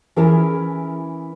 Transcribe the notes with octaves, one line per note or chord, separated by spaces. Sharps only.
E3 C#4 E4 G#4 A#4 A5